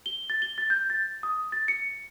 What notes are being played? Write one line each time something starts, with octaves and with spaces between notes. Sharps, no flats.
G7
A6
G7
A6
G6
A6
D#6
A6
C#7